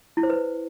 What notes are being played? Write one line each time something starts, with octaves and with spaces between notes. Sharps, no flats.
E4
C5
B4